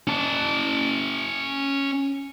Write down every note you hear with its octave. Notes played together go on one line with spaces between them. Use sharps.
C#4 A5